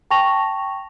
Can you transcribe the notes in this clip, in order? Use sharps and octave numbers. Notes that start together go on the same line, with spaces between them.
G5 A5 C#6 A#6 F7